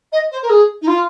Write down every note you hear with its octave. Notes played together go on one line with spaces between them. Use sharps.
D#5
C5
A#4
G#4
D#4
F4